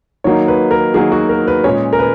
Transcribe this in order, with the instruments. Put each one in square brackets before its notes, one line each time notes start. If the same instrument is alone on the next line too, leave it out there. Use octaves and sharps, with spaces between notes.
[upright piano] D#3 F#3 A#3 D#4 [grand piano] C#5
[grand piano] B4
A#4
[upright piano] D#3 F#3 A#3 D#4 [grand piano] G#4
[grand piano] F#4
A#4
B4
[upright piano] A#2 G#3 C#4 G#4 [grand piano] C#5
[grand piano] A#4
B4